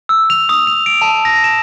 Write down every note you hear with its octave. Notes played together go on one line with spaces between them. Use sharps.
E6
F7
D#6
F7
D7
A5
A#6
E7